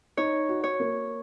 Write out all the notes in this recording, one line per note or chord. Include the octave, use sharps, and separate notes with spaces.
D#4 C#5
F#4
C#5
A#3